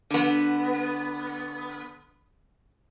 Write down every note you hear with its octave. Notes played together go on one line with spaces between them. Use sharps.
D3 B3